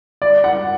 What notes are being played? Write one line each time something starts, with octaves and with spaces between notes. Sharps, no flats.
D5
F#5